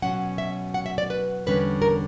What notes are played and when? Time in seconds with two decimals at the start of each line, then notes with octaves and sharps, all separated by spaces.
0.02 B2 F#3 C#4 F#5
0.38 E5
0.74 F#5
0.86 E5
0.98 D5
1.10 B4
1.46 E2 D3 G3 C#4 B4
1.82 A#4